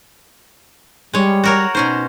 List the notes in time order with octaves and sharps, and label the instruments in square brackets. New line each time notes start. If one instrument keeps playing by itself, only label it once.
[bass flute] G3 [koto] G#3 C#5
[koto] F#4 A#4 C#5
[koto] B2 C#4 C5 [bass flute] D#4